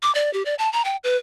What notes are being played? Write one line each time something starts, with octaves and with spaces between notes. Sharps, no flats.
D6
D5
G4
D5
A5
A#5
G5
B4